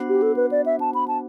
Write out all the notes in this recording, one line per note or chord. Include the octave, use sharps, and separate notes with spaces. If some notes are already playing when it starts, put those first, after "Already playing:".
Already playing: B3 D4 F#4 C5 F#5
G4
A4
B4
D5
E5
A5
B5
A5